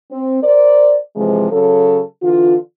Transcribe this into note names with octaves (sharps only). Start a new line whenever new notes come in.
C4
A#4 C5 D5
C3 E3 F3 G#3
C#3 F#3 A4
D3 E3 F4